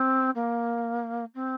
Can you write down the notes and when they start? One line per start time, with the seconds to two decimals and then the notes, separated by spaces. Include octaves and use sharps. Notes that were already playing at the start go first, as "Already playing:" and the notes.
Already playing: C4
0.35 A#3
1.35 C4